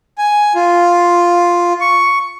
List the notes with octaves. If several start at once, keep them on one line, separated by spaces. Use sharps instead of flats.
G#5
F4
C#6